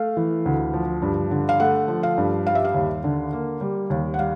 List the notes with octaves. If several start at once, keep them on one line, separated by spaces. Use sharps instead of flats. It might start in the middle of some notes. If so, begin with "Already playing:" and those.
Already playing: A3 F5
E3
D2
F3
G2
D3
F5
A3 F#5
F3
F5
G2
G3 F5
E5
F5
D#2
D3
A#3
G3
D#2
F#5
G3 F5